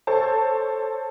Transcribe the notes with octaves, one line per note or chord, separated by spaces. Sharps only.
A4 C5 C#5 A5